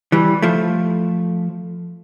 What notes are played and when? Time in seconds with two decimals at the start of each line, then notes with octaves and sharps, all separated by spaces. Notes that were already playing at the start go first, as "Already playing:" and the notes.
0.12 E3 G3
0.42 F3 A3